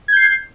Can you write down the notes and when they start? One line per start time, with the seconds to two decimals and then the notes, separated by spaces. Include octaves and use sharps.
0.08 G#6
0.12 G6
0.17 C7